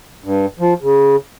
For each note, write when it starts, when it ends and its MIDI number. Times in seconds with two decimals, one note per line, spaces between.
0.24 0.46 43
0.59 0.74 53
0.82 1.16 49